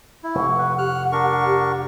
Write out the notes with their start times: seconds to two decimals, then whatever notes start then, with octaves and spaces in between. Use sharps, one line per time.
0.23 E4
0.35 F1 F#5 C#6
0.59 B4
0.78 G4 F6 F#6
1.12 D4 A#4 C#6
1.45 G4